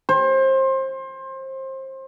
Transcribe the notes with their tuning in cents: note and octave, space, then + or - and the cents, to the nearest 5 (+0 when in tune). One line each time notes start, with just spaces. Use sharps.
C5 +25